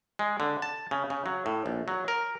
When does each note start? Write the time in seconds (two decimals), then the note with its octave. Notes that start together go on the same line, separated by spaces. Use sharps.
0.19 G#3
0.40 D3
0.62 A5
0.91 C#3
1.10 C#3
1.26 F#3
1.46 A2
1.66 A#1
1.88 F#3
2.08 A#4